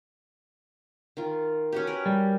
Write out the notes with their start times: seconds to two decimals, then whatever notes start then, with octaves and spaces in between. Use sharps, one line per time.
1.17 D#3 F4
1.72 C#4 F#4 G4
1.87 A#4 B4
2.06 G3